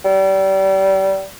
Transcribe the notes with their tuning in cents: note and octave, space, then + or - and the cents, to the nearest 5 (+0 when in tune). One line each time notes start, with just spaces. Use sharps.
G3 -30